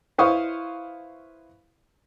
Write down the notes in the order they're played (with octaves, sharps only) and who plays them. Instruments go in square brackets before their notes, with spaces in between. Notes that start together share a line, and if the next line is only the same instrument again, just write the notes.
[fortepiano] E4 B4 C5 F5 C#6 D#6